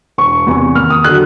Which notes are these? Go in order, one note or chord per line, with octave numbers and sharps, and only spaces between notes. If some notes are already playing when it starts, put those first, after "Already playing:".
E1 C#6
E2 C3 E3
D#2 F6
D#6
D3 F#3 F#6